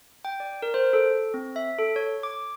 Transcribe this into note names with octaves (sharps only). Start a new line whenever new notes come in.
G5
D5
A#4
C5
A4
C4
E5
A4
C#5
D6